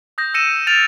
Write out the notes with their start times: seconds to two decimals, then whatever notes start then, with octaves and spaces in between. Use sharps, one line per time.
0.18 D#6 G6 A#6
0.34 E6 A#6 C#7 D#7 E7
0.67 F6 A6 D7 E7 F7